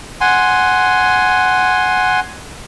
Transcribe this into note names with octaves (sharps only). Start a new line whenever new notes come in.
F#5 G#5 C6